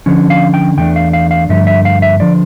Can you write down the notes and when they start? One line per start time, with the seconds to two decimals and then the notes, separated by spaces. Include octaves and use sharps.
0.06 D3 F3 C#4
0.30 F5
0.54 G5
0.77 E2 E3 A3 D4 G5
0.96 F5
1.13 F5
1.31 F5
1.49 G2 D3 F3 A3 E5
1.67 E5
1.85 F5
2.02 E5
2.20 D3 F3 D5